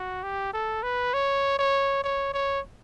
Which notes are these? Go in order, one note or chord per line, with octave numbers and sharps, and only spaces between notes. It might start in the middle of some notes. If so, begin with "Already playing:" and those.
Already playing: F#4
G4
A4
B4
C#5
C#5
C#5
C#5